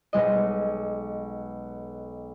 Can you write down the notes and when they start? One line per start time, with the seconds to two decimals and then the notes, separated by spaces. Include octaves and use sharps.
0.13 B1 G#3 D#5